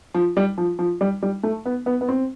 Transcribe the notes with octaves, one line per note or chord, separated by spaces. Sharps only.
F3
G3
F3
F3
G3
G3
A3
B3
B3
B3
C4